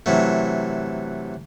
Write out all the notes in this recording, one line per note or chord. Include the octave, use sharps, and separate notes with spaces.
C3 E3 F#3 A3